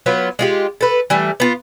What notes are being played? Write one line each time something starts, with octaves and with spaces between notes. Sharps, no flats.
F#3 B3 F4
G#3 F4 G4
A4 B4
E3 G3 A3
B3 F4